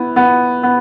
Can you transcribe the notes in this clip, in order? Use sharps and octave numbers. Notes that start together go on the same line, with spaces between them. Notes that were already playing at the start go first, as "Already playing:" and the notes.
Already playing: B3 E4
B3
B3